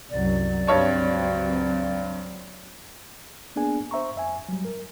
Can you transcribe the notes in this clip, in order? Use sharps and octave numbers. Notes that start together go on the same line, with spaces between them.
C2 F#2 F#3 D5
C#2 G2 F#3 C4 C#5 A5
A#3 B3 D4 G#4 G#5
C5 E5 A#5 C#6
F2 E5 G#5
F#3 G3
A#4